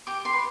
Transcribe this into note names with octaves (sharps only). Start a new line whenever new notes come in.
G4 D6
C6
B4